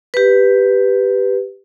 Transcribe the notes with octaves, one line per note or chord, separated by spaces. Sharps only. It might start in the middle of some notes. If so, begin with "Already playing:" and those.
G4 B4